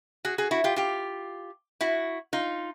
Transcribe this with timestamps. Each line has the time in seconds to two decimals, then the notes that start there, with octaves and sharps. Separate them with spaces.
0.25 F#4 G#4
0.38 F#4 G#4
0.51 E4 F#4
0.64 F4 G4
0.76 F4 G4
1.81 E4 F#4
2.33 D#4 F4